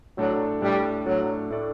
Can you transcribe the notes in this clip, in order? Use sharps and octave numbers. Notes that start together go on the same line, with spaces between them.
A2 F#3 A3 D4 A4 D5
A2 G3 A3 D4 A4 D5
A2 F#3 A3 D4 A4 D5
A2 A3 D4 A4 D5